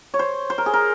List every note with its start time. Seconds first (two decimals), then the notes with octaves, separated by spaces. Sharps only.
0.14 C#5
0.19 C5
0.50 C5
0.58 A#4
0.66 G#4
0.74 A#4